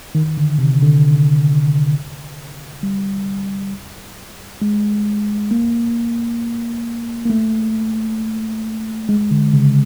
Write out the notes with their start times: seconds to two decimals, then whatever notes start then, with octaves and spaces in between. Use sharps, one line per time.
0.15 D#3
0.37 D3
0.59 C3
0.82 D3
2.83 G3
4.62 G#3
5.51 A#3
7.25 A#3
7.30 A3
9.09 G#3
9.31 D3
9.53 C#3